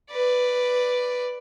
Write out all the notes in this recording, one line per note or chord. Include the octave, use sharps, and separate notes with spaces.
B4 D5